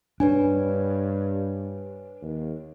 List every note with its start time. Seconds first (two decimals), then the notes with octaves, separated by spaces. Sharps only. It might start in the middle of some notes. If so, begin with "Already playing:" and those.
0.20 G2 D4 B4 C#5 G#5
2.22 D#2